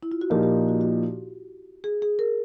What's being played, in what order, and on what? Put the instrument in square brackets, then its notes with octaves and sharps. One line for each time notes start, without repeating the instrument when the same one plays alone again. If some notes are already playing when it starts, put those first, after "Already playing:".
[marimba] E4
F4
F#4
[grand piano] A#2 F3 A#3 D#4 [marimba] G4
[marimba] G4
F#4
F#4
G#4
G#4
A#4